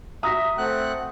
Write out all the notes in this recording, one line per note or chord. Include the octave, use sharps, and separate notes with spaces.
F#4 E5 A#5 D#6 A#6 B6
A3 C4 F#5 F#6